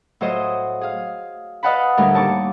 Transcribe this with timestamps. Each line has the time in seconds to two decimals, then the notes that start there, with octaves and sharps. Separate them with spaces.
0.21 A2 F#3 F4 C5 D#5 D#6
0.81 G#4 F5
1.63 B4 D#5 F5 F#5 A5 B5
1.97 D2 A2 G3 A#4
2.14 D#2 A5 C#6 D6